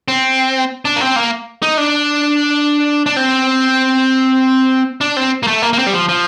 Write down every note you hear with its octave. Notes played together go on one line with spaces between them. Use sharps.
C4
D4
A#3
C4
A#3
D#4
D4
D4
C4
D4
C4
A#3
A3
A#3
A#3
C4
G3
F3
F3